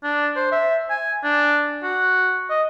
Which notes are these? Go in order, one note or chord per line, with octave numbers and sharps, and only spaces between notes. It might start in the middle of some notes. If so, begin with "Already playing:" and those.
D4
C5
E5
G#5
D4
F#4
D#5